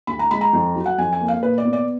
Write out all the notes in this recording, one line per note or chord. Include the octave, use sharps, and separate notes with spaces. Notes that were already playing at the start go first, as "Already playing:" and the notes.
D2 B5
A#5
G#3 B5
A#5
F2
F#3
F#5
F2 G#5
G#5
A#3
F5
A#2 B4
D5
B3
D5